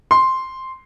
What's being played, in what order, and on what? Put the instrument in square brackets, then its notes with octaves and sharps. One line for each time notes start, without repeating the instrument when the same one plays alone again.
[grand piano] C6